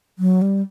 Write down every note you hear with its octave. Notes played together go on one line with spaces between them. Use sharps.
F#3
G3